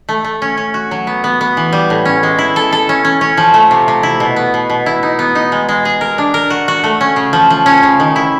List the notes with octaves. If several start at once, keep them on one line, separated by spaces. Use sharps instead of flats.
A3
A3
C#4
C#4
F#4
F#3
B3
B3
B3
E3
G3
A2
C#4
G#3
E4
A4
A4
C#4
C#4
C#4
F3
A3
C3
C3
E4
B2
B3
B2
B2
E4
D#4
B3
D#4
G#3
G#3
G#4
A#4
D4
A#4
F#4
F#4
A3
C#4
C#3
F3
F3
C#4
C#3
D#3
E4